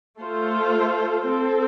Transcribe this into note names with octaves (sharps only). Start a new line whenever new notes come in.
A3 F4 A4 C5
C4 A4 C5